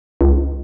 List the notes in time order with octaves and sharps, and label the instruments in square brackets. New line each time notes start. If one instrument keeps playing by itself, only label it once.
[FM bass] C#2